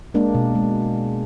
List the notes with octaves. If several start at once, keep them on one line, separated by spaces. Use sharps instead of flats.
G#3 A#3 D4
B2
G#3